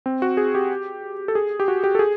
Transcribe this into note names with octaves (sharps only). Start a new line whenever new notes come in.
C4
F#4
G#4
G4
A4
G#4
G4
F#4
G4
A4
G#4